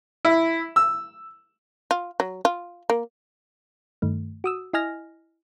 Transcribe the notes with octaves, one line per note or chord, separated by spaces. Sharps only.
E4
E6
F4
F#3
F4
A#3
G2 D#3 A3
F#4 D#6 E6
E4 D#5 G#5 F6 A#6